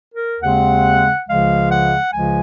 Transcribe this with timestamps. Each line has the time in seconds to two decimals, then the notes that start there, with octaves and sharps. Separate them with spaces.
0.12 A#4
0.40 D#2 C#3 G#3 C4 F#5
1.26 C#2 C#3 F3 G#3 F5
1.69 F#5
2.12 C#2 C#3 F3 G#3 G#5